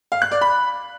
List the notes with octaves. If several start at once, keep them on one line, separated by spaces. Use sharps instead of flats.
F5
F#6
D5
B5